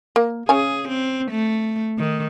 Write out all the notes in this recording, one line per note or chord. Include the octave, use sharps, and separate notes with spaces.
A#3
C#3 C#4 G#4 G#5
C4
A3
D#3